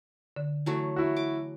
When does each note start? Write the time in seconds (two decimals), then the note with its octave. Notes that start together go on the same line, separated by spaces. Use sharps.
0.36 D3
0.66 E3 F#3 A3
0.96 E4 F#4
1.16 D6